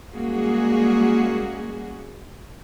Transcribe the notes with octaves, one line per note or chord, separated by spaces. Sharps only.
G3 G#3 A#3 C#4 F#4 G#4